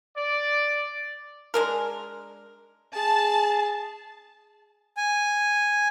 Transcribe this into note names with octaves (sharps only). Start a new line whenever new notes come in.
D5
G#3 D4 A#4
G#4 A5
G#5